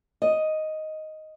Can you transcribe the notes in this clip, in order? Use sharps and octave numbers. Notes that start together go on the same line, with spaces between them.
D#5